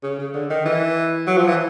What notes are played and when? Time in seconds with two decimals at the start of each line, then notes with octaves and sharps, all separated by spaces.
0.03 C#3
0.19 C#3
0.34 D3
0.50 D#3
0.65 E3
1.27 F#3
1.37 F3
1.47 E3